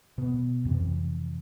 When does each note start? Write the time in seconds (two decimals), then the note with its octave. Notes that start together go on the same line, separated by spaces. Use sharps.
0.18 B2 B3
0.65 F2 C3 E3